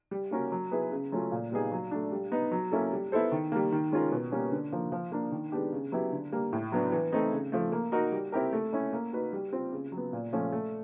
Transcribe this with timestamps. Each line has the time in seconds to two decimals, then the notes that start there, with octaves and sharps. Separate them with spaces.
0.11 G3
0.31 A#3 C#4 F#4 A#4
0.52 F#3
0.71 B3 E4 G#4 B4
0.92 C#3
1.12 F#3 A3 C#4 F4
1.32 A#2
1.52 G3 B3 D#4 G#4
1.72 F#3
1.91 A3 D4
2.12 G3
2.32 B3 D#4
2.52 F#3
2.72 A#3 C#4 E4 A4
2.92 G3
3.12 B3 E4 A4 C5
3.32 D#3
3.52 G3 A#3
3.72 D#3
3.92 G#3 C#4 F4 A#4
4.12 B2
4.32 G3 A#3 C#4
4.52 D3
4.72 F3 A#3
4.92 F3
5.12 A#3 D4
5.32 D#3
5.52 G#3 B3 D4 G4
5.73 C#3
5.92 F#3 B3 E4 G4
6.12 D3
6.32 G3 A#3
6.53 A2
6.72 F#3 B3 D4
6.92 E3
7.12 A3 C4 D#4
7.32 C#3
7.52 F3 A3
7.72 A#3
7.92 D#4 F#4 A#4
8.12 G3
8.32 C4 E4 G4 A#4
8.53 A3
8.73 C#4 E4
8.93 A#3
9.13 D#4 F#4 B4
9.33 G3
9.53 C4 F4
9.72 C#3
9.92 F#3
9.97 B3
10.13 A#2
10.33 F3 A3 C#4
10.52 A3